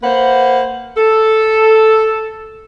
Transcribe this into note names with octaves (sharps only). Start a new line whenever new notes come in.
A#3 B4 C5 F#5
A4